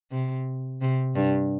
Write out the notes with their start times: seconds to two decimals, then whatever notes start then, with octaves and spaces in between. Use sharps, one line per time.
0.11 C3
0.81 C3
1.15 G2